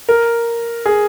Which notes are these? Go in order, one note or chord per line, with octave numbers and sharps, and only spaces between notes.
A#4
G#4